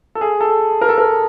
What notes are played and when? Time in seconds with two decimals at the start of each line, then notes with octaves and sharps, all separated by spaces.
0.15 A4
0.21 G#4
0.41 A4
0.81 A#4
0.89 A4
0.98 A#4